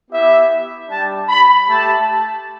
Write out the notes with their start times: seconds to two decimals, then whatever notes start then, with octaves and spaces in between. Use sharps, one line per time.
0.11 B3 E4 G4 E5
0.89 G3 D4 G4 A5
1.28 B5
1.68 A3 G4 A5